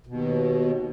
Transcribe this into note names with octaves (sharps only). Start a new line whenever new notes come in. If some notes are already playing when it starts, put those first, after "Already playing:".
D#2 B2